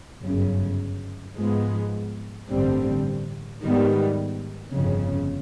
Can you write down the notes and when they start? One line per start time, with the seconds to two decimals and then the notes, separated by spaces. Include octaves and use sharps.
0.23 G1 F#2 C#3
1.36 G#2 F3 G#3 B3
2.48 A1 G2 D3 G3 C4
3.61 G#2 D#3 G3 B3
4.74 G1 F2 C#3